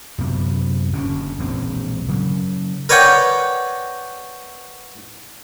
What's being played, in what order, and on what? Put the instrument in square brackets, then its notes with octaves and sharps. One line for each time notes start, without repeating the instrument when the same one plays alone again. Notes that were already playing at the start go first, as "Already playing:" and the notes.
[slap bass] F#2 C3 B3
F#1 F#2 D3 C#4
E1 A#1 C4
C#3 F#3
[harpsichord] A#4 B4 C#5 D5 F#5 G5